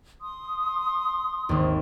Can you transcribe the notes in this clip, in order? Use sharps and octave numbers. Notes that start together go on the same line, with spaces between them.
C6 D#6
G#1 D#2